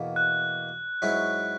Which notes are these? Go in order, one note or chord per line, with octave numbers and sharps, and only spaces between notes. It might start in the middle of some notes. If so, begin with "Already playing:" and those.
Already playing: E2 B2 A#3
F#6
G#2 F#3 C#4 E4